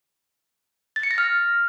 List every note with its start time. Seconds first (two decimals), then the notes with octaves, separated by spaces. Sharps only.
0.96 A6
1.03 C#7
1.11 A#6
1.18 F6